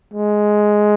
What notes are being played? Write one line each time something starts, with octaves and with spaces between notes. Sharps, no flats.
G#3